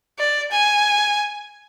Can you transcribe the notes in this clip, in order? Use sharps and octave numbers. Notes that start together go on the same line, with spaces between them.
D5
G#5